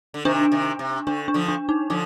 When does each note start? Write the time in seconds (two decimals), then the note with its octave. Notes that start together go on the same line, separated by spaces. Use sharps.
0.14 D3
0.25 C3 D#3 D4
0.52 C3 D#3
0.79 C3
1.07 D3 D4
1.28 D4
1.34 D3 F3
1.48 D4
1.69 D#4
1.90 D3 F3 D#4